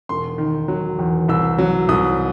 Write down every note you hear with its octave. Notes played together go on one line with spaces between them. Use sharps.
E1 C6
D#3
F#3
E2
C2 E6
F#3
C2 D#6